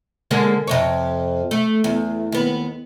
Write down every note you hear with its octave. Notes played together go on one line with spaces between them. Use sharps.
D3 G#3 A#3
F2 C3 C#5
A3
E2
D#2 B3